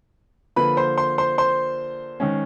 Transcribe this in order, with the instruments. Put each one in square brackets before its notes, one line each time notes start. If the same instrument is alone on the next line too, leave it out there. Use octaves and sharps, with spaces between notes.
[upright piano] D3 F3 A#3 B4 B5
C5 C6
C5 C6
C5 C6
C5 C6
D#3 G#3 C#4